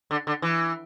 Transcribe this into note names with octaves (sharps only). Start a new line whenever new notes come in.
D3
D3
E3